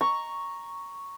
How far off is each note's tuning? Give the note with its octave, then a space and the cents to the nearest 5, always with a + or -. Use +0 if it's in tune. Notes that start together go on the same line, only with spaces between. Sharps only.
A#5 +0 C#6 +0